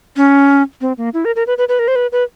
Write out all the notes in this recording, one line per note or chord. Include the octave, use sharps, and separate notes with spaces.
C#4
C4
A#3
E4
A#4
A#4
B4
B4
B4
A#4
C5
B4
B4